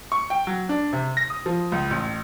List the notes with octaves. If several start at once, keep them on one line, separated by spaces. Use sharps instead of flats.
C#6
G5
F#3
D4
C3
A#6
D#6
F3
C#2
A1